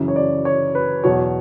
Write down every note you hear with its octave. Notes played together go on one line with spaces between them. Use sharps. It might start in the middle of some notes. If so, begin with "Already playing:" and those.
Already playing: F#2 C#3 E3
C#5
D5
C#5
B4
E2 B2 F#3 C#5